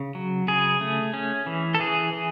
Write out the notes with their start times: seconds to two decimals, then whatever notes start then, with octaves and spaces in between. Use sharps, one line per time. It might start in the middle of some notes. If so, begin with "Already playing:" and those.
Already playing: C#3
0.15 F#3
0.48 C#3 G#4
0.81 A3
1.14 C#4
1.46 E3
1.75 A4
1.80 E3 G#4
2.13 E3